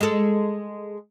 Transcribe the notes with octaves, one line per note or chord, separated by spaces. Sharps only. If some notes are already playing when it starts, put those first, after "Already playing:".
G#3 A4